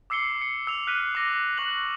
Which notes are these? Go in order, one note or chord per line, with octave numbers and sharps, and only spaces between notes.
D6 E6 C7 C#7 G7
C#7
E6 F7
F6 F#6 B6 D#7
D6 A#6
C#6 F#6 F#7